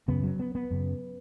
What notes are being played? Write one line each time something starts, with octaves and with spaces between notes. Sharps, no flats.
F#2 C#3 B3
F#3
B3
B3
F#2 C#3